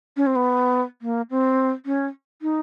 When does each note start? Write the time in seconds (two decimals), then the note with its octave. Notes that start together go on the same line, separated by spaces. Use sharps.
0.17 C#4
0.27 C4
0.36 B3
1.02 A#3
1.30 C4
1.86 C#4
2.42 D#4